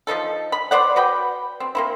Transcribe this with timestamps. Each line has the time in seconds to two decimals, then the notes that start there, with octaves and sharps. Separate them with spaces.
0.07 F3 G3 D#4 A4
0.52 B5
0.71 B4 C5 D5 F#5
0.96 F#4 B4 D5 G5
1.60 C4
1.75 A#3 C4 E4